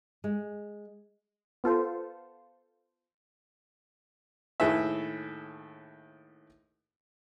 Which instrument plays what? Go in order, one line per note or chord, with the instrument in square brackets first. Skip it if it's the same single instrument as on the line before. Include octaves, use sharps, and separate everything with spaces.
[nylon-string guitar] G#3
[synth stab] B3 F4 A4 C5
[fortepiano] D#2 A2 G#4 B4 E5